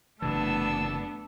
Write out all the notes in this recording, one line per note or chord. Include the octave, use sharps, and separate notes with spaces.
F#1 C3 E3 A3 B3 D4 A5 E6